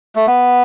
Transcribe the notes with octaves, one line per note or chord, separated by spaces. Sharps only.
A3
B3